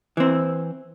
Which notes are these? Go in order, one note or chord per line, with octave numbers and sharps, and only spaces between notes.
E3 C4